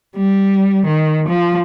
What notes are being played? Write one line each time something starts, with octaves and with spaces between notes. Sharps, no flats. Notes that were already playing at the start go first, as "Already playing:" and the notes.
G3
D#3
F3